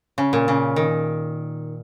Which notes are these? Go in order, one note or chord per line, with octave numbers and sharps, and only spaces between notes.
C#3
A#2
C#3
D#3